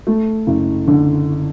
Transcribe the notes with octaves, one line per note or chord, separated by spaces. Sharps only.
A3
F#1
D3